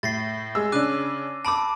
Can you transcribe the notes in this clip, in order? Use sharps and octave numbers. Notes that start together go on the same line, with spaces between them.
A2 A6 A#6 C7
G#3 G#4 E6
C#3 C#4 D4 D6 F#6 D#7
A5 B5 D6 E6 D7